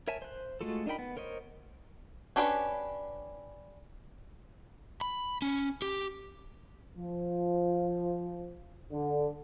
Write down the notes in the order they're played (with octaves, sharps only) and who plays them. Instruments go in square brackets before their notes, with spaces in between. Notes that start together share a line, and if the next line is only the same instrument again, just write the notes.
[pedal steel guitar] A#4 C#5 E5 G#5 A5
C5 F#6
G#3 A3 F4 F#4 A4
D4 D#4 A#4 G5 B5
B3
A#4 C5 C#5 D#5
[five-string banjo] C#4 D4 G4 B4 C#5
[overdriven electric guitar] B5
C#4
G4
[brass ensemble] F3
D3